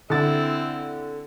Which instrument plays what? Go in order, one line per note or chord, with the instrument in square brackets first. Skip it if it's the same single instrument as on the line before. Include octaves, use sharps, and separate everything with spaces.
[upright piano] D3 A6 [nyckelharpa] C4 E4